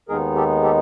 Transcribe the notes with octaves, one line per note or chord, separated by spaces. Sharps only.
D#2 D#3 G#3 B3 D#4 G#4 A#4
G4 A4
G4 A4